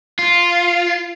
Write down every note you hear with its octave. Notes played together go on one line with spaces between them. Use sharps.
F4